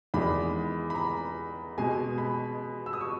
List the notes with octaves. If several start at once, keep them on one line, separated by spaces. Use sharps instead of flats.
E2 D#3 G#3 B5
B5
A#5
B2 G#3 G#5
B5
E6
D#6
C#6